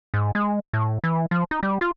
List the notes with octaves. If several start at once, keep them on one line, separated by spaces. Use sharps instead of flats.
G#2
G#3
A2
E3
F3
D#4
G3
F4